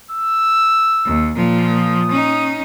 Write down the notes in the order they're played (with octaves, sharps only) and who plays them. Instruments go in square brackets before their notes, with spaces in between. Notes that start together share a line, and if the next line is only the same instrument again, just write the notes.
[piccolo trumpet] E6
[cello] D#2
A#2 F3
[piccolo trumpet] D#6
[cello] C#4 D#4